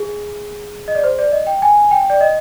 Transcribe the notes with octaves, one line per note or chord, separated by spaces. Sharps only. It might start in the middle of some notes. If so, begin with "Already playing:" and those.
Already playing: G#4
D#5
D5
C5
D5
D#5
G5
G#5
G5
D5
D#5